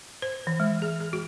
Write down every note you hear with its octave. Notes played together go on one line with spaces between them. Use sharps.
C5
E3
G#3
G#4
G#4
F#4